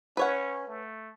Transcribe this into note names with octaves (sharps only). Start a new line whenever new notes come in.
C#4 B4 C#5 F#5
A3